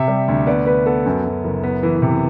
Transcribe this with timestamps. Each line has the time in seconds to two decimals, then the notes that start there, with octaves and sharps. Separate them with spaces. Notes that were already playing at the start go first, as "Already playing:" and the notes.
Already playing: C3 E5
0.08 G3
0.28 D2
0.47 B3 D5
0.66 B3 B4
0.86 B3 A4
1.06 F#2
1.24 F#2
1.44 F#1
1.64 B3
1.83 E3
2.02 C3